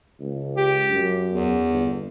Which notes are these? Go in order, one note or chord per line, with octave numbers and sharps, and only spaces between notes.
C#2
G4
F#2
E2
G1